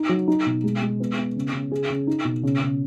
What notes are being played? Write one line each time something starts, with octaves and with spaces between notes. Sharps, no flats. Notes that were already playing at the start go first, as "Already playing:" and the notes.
Already playing: D#4
F#3
D#4
B2
G#3
G#3
B3
B3
C#3
C#3
G#4
C#3
D#4
B2
C#3
C#3